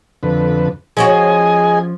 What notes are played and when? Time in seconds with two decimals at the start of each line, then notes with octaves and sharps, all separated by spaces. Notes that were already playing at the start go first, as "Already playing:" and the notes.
0.23 F2 D3 B4
0.97 F3 C#4 F#4 G#4 D#5 G#5